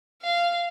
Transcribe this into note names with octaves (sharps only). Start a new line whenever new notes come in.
F5